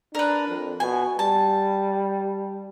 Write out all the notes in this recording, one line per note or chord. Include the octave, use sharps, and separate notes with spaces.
D4 A#4 B4
F2
B2 G#5
G3 A5